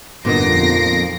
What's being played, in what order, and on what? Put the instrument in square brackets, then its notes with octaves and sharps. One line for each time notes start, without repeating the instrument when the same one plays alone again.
[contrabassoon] G1 [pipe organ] F2 [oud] A#2 B3 D#4 [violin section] A#6 C7 D7